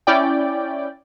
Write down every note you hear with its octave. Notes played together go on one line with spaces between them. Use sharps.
C#4 E4 D5 G5